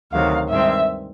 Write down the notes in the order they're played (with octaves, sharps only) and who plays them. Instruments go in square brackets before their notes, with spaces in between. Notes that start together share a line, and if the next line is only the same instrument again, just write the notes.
[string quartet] D2 C3 D#3 F#3 [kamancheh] F5
[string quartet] G2 D#3 G#3 C4 [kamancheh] E5